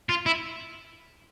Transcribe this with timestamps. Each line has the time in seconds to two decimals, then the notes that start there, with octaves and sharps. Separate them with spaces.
0.09 F4
0.26 E4